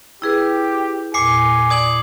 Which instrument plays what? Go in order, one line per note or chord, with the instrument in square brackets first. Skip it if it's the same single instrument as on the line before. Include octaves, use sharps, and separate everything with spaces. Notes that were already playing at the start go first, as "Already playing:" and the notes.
[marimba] E4 G#4 B4 [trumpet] G4
[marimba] E2 A#2 [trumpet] G#5 [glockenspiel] D6 C7 C#7
[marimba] D5 [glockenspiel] D#6 G#6 F#7